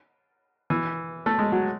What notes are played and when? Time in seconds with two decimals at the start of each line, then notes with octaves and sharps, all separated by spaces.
0.70 E3
1.26 A3
1.39 G#3
1.52 F#3